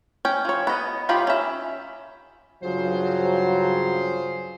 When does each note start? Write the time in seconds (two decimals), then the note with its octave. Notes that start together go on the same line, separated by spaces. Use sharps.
0.25 C#4 G5
0.45 F3 C#5
0.67 B3 D#5
1.09 D#3 C#4 F4 G4 B5
1.27 C#4 E5
2.63 G2 C#3 F#3 F4 G#4 C5